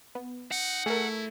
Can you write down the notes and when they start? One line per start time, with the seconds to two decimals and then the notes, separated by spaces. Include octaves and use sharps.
0.15 B3
0.51 D#4 F#5
0.86 A3 E4 G#4 A#4